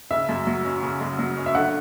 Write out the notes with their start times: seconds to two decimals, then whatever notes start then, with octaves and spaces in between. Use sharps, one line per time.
0.11 C#3 E5
0.29 F#2
0.47 F#3
0.65 C#4
0.83 C#3
1.01 F#2
1.19 F#3
1.37 C#4
1.46 E5
1.55 D3 F#5